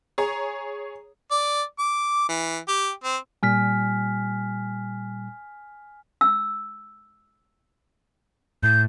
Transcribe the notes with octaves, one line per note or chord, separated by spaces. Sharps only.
G#4 C#5 A#5
D5
D6
E3
G4
C4
A#2 G3 G#5 F6 B6
E6
A2 G6